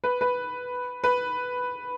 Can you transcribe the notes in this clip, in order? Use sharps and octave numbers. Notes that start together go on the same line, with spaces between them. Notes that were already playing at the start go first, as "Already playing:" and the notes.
B4
B4
B4